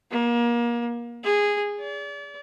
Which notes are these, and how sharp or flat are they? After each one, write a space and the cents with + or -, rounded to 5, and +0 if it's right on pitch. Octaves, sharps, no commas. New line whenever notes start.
A#3 +30
G#4 -10
D5 -35